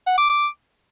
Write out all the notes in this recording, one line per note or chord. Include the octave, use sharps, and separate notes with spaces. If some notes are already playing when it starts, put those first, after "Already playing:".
F#5
D6
D6